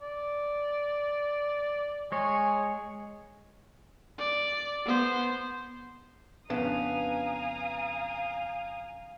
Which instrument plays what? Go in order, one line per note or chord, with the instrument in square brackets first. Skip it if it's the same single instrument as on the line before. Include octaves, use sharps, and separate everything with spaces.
[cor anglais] D5
[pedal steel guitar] G#3 C#5 [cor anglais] G#4
[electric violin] D5
B3 C5
[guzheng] F2 C#3 D4 [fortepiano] B3 [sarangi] F5 [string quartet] G#5 A#5 D#6